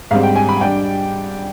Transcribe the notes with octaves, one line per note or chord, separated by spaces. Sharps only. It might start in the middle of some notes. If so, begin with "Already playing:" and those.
G#2 G3 C4 F5
G5
G#5
B5
G3 D4 G5